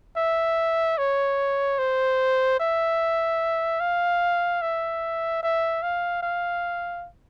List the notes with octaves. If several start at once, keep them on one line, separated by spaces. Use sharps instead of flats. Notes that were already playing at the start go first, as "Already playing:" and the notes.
E5
C#5
C5
E5
F5
E5
E5
F5
F5